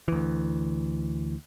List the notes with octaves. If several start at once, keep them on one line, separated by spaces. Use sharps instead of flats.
D2 E3